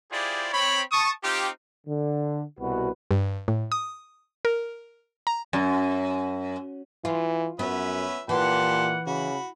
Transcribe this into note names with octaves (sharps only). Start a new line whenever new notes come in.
E4 F4 G4 G#4 C5 D5
C4 C#5 B5
A5 C#6 D#6
C4 D#4 F4 G4
D3
C2 B2 F#4 B4
G2
A2
D#6
A#4
A#5
F#2
E3 F4
F#2 B3 C#4 B4 E5
A#2 E3 G4 F#5 A5 C6
C#3 F#4 B5